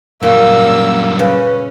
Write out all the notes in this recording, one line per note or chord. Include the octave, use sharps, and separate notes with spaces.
F#2 A#2 C#3 G3 A#3 E6
C#3 C#4 B4